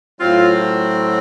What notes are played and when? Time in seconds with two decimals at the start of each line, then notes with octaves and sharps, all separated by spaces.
0.19 A2 F#3 C4 F4